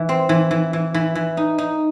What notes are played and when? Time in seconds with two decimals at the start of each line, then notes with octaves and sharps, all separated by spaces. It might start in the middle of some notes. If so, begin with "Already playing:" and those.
Already playing: E3
0.09 C4
0.29 E3
0.51 E3
0.73 E3
0.94 E3
1.15 E3
1.37 D#4
1.58 D#4